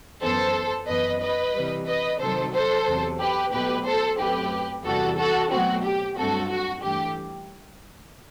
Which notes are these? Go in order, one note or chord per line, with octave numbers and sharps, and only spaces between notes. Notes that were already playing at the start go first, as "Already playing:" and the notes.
F#2 E3 B3 A4 C5
F#2 E3 B3 B4 D#5
B4 D#5
C3 E3 G3
B4 D#5
C3 D#3 F#3 A4 C5
A4 C5
E2 C3 F#3
G4 B4
B2 F#3 A3 G4 B4
A4 C5
F#2 F#3 A3 C4 G4 B4
E2 C3 E3 G3 F#4 A4
F#4 A4
B2 F#3 A3 C4 F#4
G4
G2 F#3 A3 C4 F#4 A4
F#4
G2 E3 A3 G4